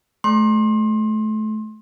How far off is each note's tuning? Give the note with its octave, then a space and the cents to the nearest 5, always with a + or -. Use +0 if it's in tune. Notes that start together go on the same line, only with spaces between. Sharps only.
A3 -30 C6 +30